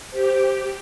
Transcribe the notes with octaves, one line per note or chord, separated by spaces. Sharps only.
G4 C5